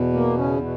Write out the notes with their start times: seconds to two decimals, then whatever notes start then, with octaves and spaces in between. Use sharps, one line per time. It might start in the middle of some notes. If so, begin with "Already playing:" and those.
Already playing: E2 B2
0.13 A#3
0.37 C#3 C#4
0.61 B2